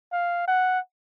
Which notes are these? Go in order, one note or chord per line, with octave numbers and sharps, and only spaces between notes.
F5
F#5